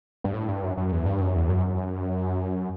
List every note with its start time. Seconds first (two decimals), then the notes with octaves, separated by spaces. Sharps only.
0.24 G2
0.34 A2
0.48 G2
0.63 F#2
0.77 F#2
0.92 E2
1.06 G2
1.21 F#2
1.36 E2
1.49 F#2